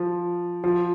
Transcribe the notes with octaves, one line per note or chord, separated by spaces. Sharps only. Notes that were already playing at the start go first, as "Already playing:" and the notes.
Already playing: F3
F3